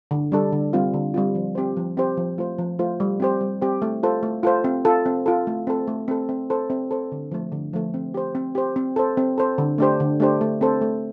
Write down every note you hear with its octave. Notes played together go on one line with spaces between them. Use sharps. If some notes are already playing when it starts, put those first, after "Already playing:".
D3
G3 D4 A4
D3
G3 C4 F4
D3
G3 C4 F4
F3
C4 G4 C5
F3
C4 G4 C5
F3
A3 F4 C5
F3
A3 F4 C5
G3
C4 G4 C5
G3
C4 G4 C5
A3
F4 A4 C5
A3
F4 A4 C5
C4
F4 A4
C4
F4 A4
A3
C4 A4
A3
C4 A4
C4
A4 C5
C4
A4 C5
D3
F3 A3
D3
F3 A3
C4
G4 C5
C4
G4 C5
C4
A4 C5
C4
A4 C5
D3
A3 D4 G4 C5
D3
A3 D4 G4 C5
A3
C4 A4 C5
A3